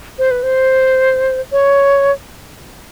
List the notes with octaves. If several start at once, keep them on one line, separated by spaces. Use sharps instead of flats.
C5
B4
C5
C#5